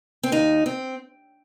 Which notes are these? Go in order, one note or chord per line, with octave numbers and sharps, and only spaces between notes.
C4
D#2 D#4
C4